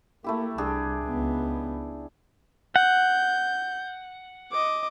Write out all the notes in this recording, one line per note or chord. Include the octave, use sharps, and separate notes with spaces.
A3 A#3 E4 G4
C2 D4 G4 G#4
C#2 B3
F#5 G6
D#5 D6